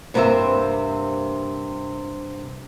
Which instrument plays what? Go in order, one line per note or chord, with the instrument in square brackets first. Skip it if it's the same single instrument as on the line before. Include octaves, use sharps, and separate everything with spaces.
[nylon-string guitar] G2 C3 A#3 F#4 C5 E5